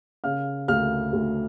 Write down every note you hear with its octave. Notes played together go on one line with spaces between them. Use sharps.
C#3 F5 F6
D2 F5 F6
D2